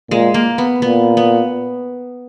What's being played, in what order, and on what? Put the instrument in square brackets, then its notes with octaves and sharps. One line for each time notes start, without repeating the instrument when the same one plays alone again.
[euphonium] A#2 [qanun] G#3
[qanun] A#3
B3
[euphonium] A#2 [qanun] B3
[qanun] B3